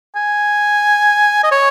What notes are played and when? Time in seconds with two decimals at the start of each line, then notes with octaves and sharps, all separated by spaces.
0.15 G#5
1.43 D#5
1.51 C#5